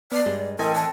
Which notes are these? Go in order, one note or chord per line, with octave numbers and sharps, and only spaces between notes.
B3 D5 F6 C7
G2 G#3
A1 E3 C4 A4 A#4 D#5 G#5
A5